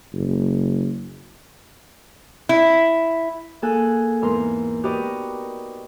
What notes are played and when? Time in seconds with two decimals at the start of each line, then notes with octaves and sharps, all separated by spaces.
0.14 F#1
2.49 E4
3.62 A#3 G#4 A4 G#5 F#6
4.22 E2 G#2 A#4 C6
4.83 F#4 G4 A#4 B4 D5 D#5